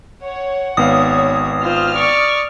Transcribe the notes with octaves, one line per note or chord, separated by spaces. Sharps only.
C#5 F#5
G#1 B3 C#5 F5 D#6
F4 C5 F6
D5 C#6